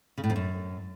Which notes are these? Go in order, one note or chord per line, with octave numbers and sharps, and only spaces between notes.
C#3
A2
F2
F#2